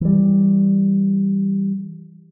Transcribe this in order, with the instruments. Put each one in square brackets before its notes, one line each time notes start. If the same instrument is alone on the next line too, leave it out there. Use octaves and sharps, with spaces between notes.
[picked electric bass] E3 G3